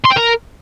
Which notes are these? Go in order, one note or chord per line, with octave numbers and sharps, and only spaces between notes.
C6
G5
A#4